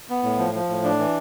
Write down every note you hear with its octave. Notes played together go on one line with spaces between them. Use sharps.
B3
A2
F3
F3
A2
D4
E3